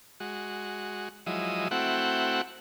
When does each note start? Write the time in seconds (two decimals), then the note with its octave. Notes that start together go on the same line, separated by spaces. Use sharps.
0.20 G#3 F#4
1.26 F3 F#3 G#3 E4 D#5
1.71 A3 C4 E4 F#4 F#5 G5